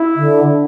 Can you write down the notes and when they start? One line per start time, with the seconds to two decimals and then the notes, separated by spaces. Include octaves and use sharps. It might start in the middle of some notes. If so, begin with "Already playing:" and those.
Already playing: E4
0.16 D3